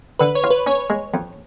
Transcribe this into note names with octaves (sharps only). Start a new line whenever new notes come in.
D3 B4
C#5
F4
B4
C#4 C#5
G#3
F2